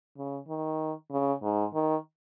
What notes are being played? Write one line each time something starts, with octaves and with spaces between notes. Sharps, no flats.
C#3
D#3
C#3
G#2
D#3